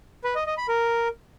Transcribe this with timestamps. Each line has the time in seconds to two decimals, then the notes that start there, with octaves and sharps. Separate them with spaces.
0.24 B4
0.35 D#5
0.46 D#5
0.58 B5
0.69 A#4